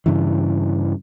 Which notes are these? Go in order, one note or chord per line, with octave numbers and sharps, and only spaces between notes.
G2 C#3 E3